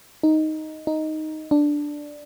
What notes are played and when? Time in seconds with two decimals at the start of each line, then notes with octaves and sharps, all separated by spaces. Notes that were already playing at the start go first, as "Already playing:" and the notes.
0.23 D#4
0.87 D#4
1.51 D4